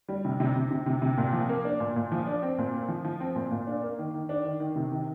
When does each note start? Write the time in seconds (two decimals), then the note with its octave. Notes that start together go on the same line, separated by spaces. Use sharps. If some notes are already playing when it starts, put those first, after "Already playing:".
0.09 G3
0.25 C3
0.40 C3
0.56 C3
0.71 C3
0.86 C3
1.02 C3
1.17 A#2
1.33 F3
1.49 A#3
1.65 D4
1.80 A#2
1.96 A#2
2.12 F3
2.27 D4
2.42 C4
2.58 A#2
2.74 C4
2.88 F3
3.05 F3
3.20 C4
3.35 A#2
3.51 A#2
3.67 D4
3.83 A#3
3.98 D#3
4.14 D#3
4.29 D4
4.44 D#3
4.60 D#3
4.76 C3
4.92 D#3